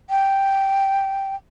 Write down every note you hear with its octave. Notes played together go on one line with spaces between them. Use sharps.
G5